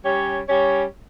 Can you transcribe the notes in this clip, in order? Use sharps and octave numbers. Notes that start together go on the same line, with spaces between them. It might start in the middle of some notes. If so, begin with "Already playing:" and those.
G3 C#4 G4 C#5
G3 C#4 G4 C#5